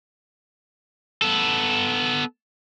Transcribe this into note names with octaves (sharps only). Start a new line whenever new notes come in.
B3 A4